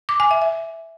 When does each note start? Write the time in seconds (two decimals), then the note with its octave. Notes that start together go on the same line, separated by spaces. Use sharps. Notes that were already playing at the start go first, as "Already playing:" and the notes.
0.09 D6
0.20 G#5
0.31 E5
0.42 E5